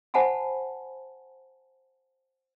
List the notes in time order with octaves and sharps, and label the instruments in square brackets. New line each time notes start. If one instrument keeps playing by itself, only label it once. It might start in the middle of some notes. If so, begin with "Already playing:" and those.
[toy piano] C5 F#5 G#5 A5 B5